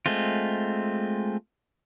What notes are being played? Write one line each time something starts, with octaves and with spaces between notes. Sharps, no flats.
G#3 A3 C4 F4